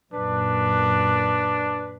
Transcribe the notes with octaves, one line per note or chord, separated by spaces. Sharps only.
F#2 A#2 D4 B4